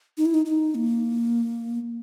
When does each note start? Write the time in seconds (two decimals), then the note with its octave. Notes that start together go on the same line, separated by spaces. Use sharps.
0.18 D#4
0.25 E4
0.34 D#4
0.46 D#4
0.75 A#3